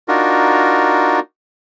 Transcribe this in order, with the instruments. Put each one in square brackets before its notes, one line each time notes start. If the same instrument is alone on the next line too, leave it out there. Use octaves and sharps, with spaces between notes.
[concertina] D4 D#4 F4 F#4 A#4